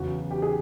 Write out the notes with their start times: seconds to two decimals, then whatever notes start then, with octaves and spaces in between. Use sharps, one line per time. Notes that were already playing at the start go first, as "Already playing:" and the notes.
Already playing: E2 C#3 F#3 F#4
0.31 G4
0.42 G#4